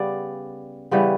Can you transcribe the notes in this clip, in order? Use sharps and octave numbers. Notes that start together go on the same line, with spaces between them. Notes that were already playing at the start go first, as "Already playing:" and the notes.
Already playing: C#3 G3 B3 D5
C#3 E3 G3 B3